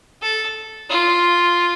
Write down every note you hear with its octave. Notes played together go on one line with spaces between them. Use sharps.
A4
F4